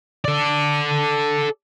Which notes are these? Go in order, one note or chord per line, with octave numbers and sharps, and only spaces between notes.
A4 D5